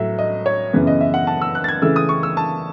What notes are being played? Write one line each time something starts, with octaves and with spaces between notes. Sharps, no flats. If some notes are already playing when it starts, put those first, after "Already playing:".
Already playing: A2 F#3 E5
D#5
C#5
F#2 C#3 E3 B3
D#5
E5
F#5
A5
E6
F#6
A6
G#6
C#3 E3 A3 E6
D#6
C#6
E6
A5